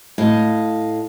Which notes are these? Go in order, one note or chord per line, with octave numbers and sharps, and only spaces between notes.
A2 D#5 F5